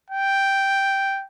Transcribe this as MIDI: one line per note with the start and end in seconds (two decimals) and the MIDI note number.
0.10 1.24 79